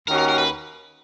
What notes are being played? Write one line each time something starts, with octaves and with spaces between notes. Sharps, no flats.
D#2 D#3 A#3 C#4 F#4 A#4
A#4
A#4
B4